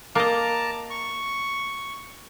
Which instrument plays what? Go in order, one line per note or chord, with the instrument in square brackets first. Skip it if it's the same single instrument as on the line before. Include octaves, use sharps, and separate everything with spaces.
[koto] A#3 D#5 [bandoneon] A5 A#5 D6
[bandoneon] C#6